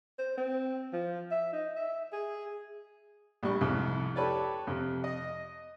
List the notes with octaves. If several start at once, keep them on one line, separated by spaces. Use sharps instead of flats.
C5
C4
F3
E5
D#4
E5
G#4
A#1 G3 C#6
C2 F2 G#2
G4 A4 B4 C#5 D5
F2 C3
D#5